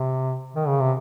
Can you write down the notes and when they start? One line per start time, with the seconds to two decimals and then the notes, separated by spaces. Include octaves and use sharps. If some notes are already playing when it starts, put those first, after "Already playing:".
Already playing: C3
0.54 D#3
0.68 C#3
0.80 C3